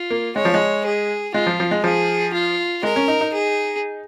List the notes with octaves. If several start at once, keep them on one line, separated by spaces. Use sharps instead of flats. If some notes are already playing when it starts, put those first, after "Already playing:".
Already playing: F4
A#3
G#3 C#5
F3
G#3
G#4
G#3 F4
F3
F3
G#3
F3 G#4
F4
G#3 A#4
C#4
D#4
D#4
G#4